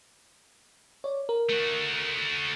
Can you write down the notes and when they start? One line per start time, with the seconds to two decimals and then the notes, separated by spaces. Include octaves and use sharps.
1.04 C#5 D5
1.29 A#4
1.50 A3 F#4